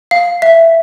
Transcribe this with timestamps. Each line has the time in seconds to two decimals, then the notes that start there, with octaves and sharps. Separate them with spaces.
0.11 F5
0.42 E5